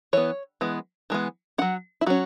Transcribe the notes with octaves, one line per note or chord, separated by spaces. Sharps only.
E3 B3 C#5
E3 G#3 B3
E3 G#3 B3
F#3 C#4 F#5
E4
F#3 C#4 F#4